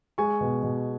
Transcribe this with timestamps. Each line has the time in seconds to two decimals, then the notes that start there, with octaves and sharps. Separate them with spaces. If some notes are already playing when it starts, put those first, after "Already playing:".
0.18 G#3 G#5 C#6
0.41 B2
0.63 B2